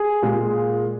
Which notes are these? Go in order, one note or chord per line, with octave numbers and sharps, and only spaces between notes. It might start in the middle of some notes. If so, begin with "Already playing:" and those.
Already playing: G#4
A#2 G#3